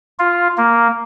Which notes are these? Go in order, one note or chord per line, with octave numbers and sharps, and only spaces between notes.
F4
A#3